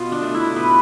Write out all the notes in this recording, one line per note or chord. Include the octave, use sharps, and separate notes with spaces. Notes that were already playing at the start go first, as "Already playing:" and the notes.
Already playing: B2 F4
D4
A3
E4
B2 B4